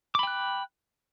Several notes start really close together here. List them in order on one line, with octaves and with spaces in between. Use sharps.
D6 B5 G5 F#6